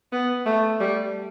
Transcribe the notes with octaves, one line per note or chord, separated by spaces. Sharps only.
B3
A3
G3